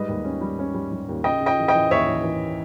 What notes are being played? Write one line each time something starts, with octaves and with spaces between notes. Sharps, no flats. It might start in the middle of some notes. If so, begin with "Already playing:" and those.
Already playing: G#2 G3 B4 D#5
D#2
C#4
G3
C#4
G3
G3
D#2
C#3 D#5 G5
C#3
D#5 G5
E3
D#5 G5
E3
D#2 C#5 E5
E3
E3